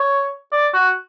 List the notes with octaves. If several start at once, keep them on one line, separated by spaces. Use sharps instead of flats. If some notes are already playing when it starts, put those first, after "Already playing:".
Already playing: C#5
D5
F#4